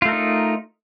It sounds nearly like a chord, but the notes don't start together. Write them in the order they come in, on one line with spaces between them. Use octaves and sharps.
F4 A3 A#4 D#4